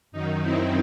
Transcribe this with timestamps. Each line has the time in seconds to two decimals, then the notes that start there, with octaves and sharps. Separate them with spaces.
0.12 F#2 D#3 F#3 D#4
0.42 C4 E4